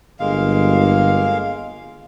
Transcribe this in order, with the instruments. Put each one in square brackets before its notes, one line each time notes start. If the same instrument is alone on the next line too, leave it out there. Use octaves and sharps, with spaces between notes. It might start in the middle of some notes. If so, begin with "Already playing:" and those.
[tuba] G1 [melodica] G#3 A#3 F5